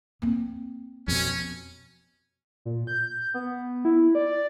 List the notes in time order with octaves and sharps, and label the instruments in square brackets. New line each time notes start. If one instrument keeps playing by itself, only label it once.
[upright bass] A#3 C4
[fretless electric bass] F2 B2 [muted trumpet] C#4
[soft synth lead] A#2
G6
B3
E4
D5